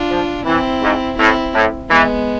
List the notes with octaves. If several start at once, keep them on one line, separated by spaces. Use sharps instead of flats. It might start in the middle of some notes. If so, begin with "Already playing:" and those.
Already playing: D4 F4
F3
E3 C4 E4
G#2
A2 C4 E4
A2
E3 G#3 B3